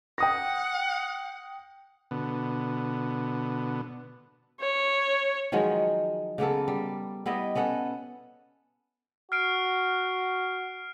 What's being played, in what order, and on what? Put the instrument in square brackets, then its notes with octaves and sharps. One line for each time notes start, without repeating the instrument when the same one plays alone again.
[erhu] F#5 [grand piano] G5 D#6 A#6
[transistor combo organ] B2 D3 B3
[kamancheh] C#5
[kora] D#3 F3 F#3 G#3
C#3 A#3 B3 A4
G3
G3 B3 E4 D#5
B3 C#4 A4 F#5
[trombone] F#4 [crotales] F6 C7 D7